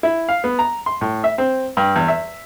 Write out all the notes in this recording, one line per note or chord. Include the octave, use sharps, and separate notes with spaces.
E4
F5
B3
A#5
C6
A2
E5
C4
G2
E2
E5